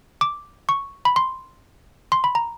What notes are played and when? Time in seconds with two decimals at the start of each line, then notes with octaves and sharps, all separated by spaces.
0.21 D6
0.69 C#6
1.05 B5
1.16 C6
2.12 C6
2.24 B5
2.35 A#5